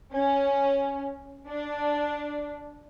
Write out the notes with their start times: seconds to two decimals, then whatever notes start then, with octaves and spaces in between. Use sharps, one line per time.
0.15 C#4
1.50 D4